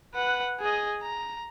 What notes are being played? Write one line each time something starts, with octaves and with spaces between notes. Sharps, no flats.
B4 F#5
G#4 D#5
A#5